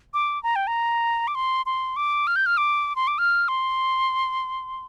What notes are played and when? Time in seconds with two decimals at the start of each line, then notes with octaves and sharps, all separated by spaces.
0.14 D6
0.43 A#5
0.56 G5
0.67 A#5
1.28 D6
1.35 C6
1.66 C6
1.96 D6
2.27 F6
2.36 G6
2.46 F6
2.57 D6
2.96 C6
3.07 D6
3.18 F6
3.48 C6